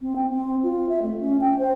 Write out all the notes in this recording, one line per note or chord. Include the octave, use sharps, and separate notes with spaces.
C4
G5
C4
F4
E5
A3
C#4
G5
C5